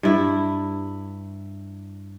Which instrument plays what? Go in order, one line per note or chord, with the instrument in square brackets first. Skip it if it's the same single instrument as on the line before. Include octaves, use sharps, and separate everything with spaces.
[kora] G2 E4